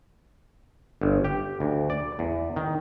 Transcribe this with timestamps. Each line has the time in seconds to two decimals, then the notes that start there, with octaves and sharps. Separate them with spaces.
1.01 G1
1.24 G4
1.60 D2
1.90 D5
2.19 E2
2.56 D#3